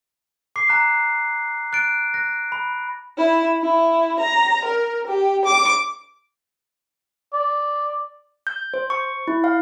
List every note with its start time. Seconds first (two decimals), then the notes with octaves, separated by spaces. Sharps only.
0.56 D6 C7
0.69 A#5 D6 F#6
1.73 F#6 A6 D7
2.14 F#6 A#6
2.52 B5
3.18 E4
3.61 E4
4.20 A#5
4.65 A#4
5.07 G4
5.44 D6
7.33 D5
8.47 G6
8.74 C5
8.90 C#6
9.28 E4
9.44 F5